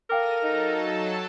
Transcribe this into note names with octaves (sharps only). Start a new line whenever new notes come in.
A4 A#4 F5 G5 D6 A#6 D#7
F#3 D#4 A4 A5